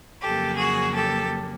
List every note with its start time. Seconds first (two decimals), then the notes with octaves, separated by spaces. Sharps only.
0.22 F2 C#3 F#3 A#3 G4 A4
0.58 F#4 G#4
0.94 G4 A4